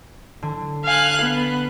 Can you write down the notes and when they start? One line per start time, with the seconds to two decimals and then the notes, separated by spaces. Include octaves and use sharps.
0.42 D3
0.84 F5 G#5 F#6
1.21 B3